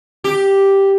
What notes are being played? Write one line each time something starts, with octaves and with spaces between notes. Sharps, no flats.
G4